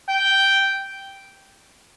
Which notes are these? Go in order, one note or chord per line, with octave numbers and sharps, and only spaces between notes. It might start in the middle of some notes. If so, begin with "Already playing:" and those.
G5